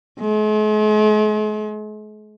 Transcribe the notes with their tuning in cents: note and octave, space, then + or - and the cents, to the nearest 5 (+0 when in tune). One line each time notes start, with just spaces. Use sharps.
G#3 +45